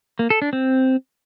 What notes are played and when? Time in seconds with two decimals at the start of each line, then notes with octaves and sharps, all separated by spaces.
0.19 A#3
0.30 A4
0.42 D4
0.53 C4